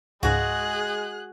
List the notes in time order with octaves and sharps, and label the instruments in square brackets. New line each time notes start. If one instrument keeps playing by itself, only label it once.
[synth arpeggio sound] C#2 G#2 [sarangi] G#3 [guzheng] F#4 [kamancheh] G#4 F#6